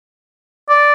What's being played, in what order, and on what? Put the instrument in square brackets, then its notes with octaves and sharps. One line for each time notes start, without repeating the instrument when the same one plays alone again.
[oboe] D5